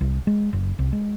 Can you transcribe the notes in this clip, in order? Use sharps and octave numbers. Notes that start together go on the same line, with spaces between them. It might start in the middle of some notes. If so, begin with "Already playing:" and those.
C2
G#3
F#1
C2
G#3